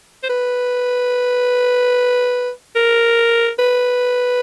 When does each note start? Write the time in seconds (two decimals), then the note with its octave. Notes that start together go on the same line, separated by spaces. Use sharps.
0.23 C5
0.30 B4
2.76 A#4
3.59 B4